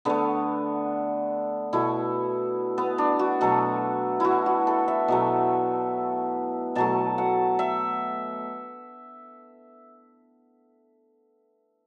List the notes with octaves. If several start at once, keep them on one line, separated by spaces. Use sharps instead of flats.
D3 A3 B3
B2 A3 E4
B3
D4
F#4
B2 F#3 A3 A4
E4 F#4
F#4
A4
E5
B2 F#3 A3
B2 F#3 A3 A5
F#5
E5